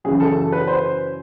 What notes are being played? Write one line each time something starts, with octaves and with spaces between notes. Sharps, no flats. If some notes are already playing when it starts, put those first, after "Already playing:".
F#2 C#3 E3 G#4
A4
A4
B4
C5